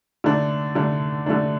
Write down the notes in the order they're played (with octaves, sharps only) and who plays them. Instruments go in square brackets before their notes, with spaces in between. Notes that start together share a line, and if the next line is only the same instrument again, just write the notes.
[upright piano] D3 A3 D4
D3 A3 D4
D3 A3 D4